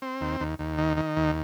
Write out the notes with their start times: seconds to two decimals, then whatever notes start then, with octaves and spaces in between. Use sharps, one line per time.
0.02 C4
0.21 D#2
0.40 D#2
0.59 D#2
0.78 D#3
0.97 D#3
1.16 D#2